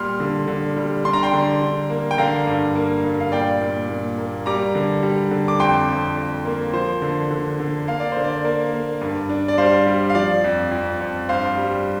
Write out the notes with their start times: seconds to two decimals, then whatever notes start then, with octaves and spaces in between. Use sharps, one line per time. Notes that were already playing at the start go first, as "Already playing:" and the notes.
Already playing: A#2 G3 C6 F6
0.20 D3
0.48 D3
0.76 G3
1.04 D4 C6
1.13 A#5
1.23 G5 C6
1.33 D3
1.62 D3
1.90 A#3
2.11 G5
2.18 D3 F5 A#5
2.47 G2
2.76 A#3
3.04 G2
3.20 F5
3.32 A#2 D5 G5
3.61 A#2
3.89 A#2
4.18 A#3
4.46 G3 A#5 D6
4.75 D3
5.03 G3
5.31 D3
5.48 D6
5.60 F2 G5 C6
5.88 F2
6.17 F2
6.45 A#3
6.73 F3 C5
7.02 D3
7.31 D3
7.60 D3
7.87 A#3 F5
8.00 D5
8.12 D3 C5
8.24 D5
8.45 A#3
8.73 A#3
9.01 G2
9.29 D4
9.48 D5
9.58 G3 C5 F5
9.87 G3
10.10 F5
10.15 F3 D5
10.44 F2
10.71 F2
11.00 F2
11.29 G2 C5 F5
11.57 G3